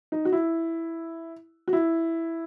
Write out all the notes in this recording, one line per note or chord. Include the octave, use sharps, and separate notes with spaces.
D#4
F#4
E4
F#4
E4